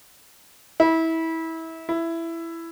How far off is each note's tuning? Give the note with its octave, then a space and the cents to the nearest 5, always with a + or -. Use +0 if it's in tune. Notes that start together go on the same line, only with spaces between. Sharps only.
E4 -25
E4 +10